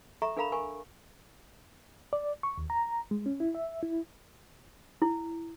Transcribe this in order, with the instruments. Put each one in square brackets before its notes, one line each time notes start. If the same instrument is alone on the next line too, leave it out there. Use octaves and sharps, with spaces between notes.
[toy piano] A4 E5 A#5 C#6
D4 A4 A#4 F5 A#5 B5
A#4 G#5 C#6
[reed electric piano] D5
C#6
D#2
A#5
G#3
C#4
E4
E5
E4
[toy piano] E4